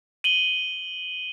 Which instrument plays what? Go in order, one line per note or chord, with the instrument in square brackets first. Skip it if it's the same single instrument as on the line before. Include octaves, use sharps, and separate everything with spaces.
[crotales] D#7 F#7 G7